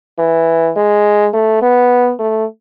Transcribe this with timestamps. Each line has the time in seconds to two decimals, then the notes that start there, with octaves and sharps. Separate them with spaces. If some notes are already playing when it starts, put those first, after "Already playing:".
0.19 E3
0.76 G#3
1.33 A3
1.62 B3
2.19 A3